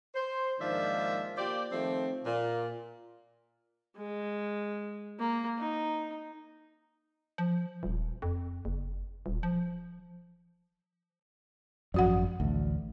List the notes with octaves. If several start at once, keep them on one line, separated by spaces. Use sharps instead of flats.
C5
G#2 D#3 F3 A#3 D4 E5
A#3 F4 G4 C5 D5
D#3 F3 A3 C4
A#2
G#3
A#3
D#4
F3
D#1
F2
F#1
D#1
F3
G#1 F#2 F3 F#4 F#5
A1 D2